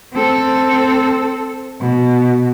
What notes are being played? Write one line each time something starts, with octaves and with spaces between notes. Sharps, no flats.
C4 A4
B2